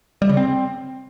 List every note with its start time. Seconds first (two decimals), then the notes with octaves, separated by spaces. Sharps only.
0.22 G3
0.29 C#3
0.37 C4